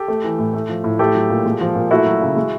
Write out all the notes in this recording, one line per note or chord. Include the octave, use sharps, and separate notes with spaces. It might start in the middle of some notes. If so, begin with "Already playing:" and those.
Already playing: G4 A4
A3
E3
A2
A3
F3
A2
A3 G4 A4
F#3
A#2
G#3
F3
A#2
A3 E4 F#4
F#3
C#3
G#3